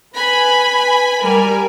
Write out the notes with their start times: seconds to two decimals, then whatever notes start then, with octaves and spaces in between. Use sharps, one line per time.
0.15 B4 G#5 B5
1.23 G3 A#4 G#5